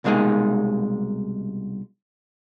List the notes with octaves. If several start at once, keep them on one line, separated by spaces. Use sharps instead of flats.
C2 B2 G#3 A#3 D#4 G#4